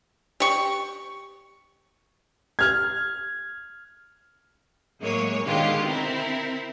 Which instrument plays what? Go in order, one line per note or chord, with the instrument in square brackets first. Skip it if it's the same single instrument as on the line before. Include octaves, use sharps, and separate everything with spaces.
[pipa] G4 C#6
[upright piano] F6 G#6
[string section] A2 F#3 G#3 A#3 C#5
B2 D3 D#3 G#3 F4 G4
C4 E4 A#4